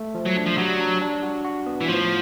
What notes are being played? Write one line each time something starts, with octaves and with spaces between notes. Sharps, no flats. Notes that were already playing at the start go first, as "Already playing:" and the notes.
Already playing: A3
F3
F#3
D4
F3
F#3 G3
D4
D4
F#4
F#4
B3
E3
A2 F3